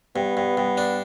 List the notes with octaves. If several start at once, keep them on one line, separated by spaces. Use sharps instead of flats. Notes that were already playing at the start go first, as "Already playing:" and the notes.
G2 B3
G2
G2
D4